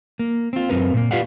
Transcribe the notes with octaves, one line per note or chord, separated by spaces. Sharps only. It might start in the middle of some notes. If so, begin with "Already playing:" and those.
A#3
C4 F4
F#2 C4 A#4 B4
A#2 A#3
F4 G4 B4 D5 F5 F#5